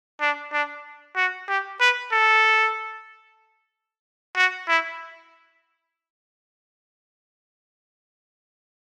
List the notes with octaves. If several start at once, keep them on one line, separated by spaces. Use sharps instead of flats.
D4
D4
F#4
G4
B4
A4
F#4
E4